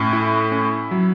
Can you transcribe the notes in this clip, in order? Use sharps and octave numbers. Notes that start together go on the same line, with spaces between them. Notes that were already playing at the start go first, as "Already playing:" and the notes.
Already playing: A2 C#4
E4
C#4
F#3